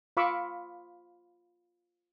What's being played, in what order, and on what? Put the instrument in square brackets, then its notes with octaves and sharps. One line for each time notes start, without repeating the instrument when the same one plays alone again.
[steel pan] F4 F5 B5 C#6 D6 E6